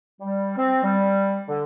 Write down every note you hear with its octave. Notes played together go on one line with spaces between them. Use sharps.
G3
C4
G3
D3